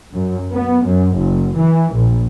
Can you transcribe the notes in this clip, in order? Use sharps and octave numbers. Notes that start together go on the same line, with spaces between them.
F#2
B3
F#2
F#1
E3
A#1